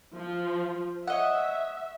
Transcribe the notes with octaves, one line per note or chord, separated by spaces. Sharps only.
F3
C#5 D#5 E5 F#5